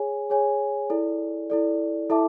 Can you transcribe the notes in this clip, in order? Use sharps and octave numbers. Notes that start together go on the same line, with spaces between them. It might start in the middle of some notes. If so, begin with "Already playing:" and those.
Already playing: G#4 C#5 G#5
G#4 C#5 G#5
E4 A4 D5
E4 A4 D5
E4 A4 E5 A5 D6